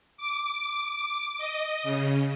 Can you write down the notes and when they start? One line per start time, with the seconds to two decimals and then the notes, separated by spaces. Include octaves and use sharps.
0.17 D6
1.38 D#5
1.84 C#3